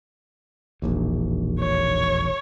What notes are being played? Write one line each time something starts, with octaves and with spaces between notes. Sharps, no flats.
E1 A#1 D#2
C#5